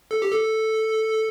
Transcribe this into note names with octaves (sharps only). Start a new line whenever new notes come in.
A4
G4
A4